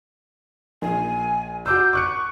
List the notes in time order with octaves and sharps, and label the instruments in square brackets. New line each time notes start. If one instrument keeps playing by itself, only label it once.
[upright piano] A#1 [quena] G#5
[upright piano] F#4 D6 E6 [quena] G6
[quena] C#6 [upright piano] D6 F#6 C#7